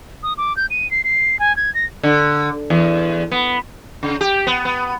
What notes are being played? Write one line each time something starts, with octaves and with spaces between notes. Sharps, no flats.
D#6
D6
G6
D#7
C7
C7
G#5
G#6
A#6
D3
E2
B3
C#3
G4
B3
B3